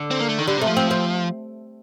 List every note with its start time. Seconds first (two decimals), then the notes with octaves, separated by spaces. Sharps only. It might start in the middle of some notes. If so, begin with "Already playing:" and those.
Already playing: D3
0.11 C4
0.20 A#3
0.29 A3
0.38 D#3
0.47 D3 G3
0.57 C3
0.62 A3
0.67 F3
0.77 C4
0.91 C4